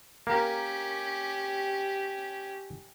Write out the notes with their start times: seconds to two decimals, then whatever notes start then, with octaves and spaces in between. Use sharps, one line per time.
0.27 A#3 C#4 G4 A#4